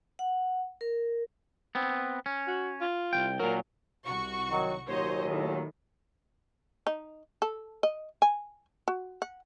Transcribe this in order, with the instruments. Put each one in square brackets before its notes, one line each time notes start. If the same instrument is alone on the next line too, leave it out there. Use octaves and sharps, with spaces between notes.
[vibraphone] F#5
A#4
[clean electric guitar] B3 C4
C#4
[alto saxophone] F#4
F4
[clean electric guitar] C2 F2 G5
[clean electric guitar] A#2 F#3 [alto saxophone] A#4
[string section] C2 F#4 C#6
[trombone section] D#3 F#3
[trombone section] D#2 A#2 F#3 [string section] C5 C#5 D#5
[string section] A2 D#3
[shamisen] D#4
A4
D#5
G#5
F#4
F#5